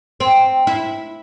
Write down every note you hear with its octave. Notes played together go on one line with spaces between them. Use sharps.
C4
E4